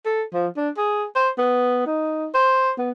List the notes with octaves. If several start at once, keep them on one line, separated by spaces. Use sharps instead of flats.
A4
F3
D4
G#4
C5
B3
D#4
C5
B3